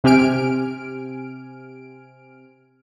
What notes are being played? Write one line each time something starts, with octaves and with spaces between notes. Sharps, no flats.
C3 C4 G4 G#5 F6 D7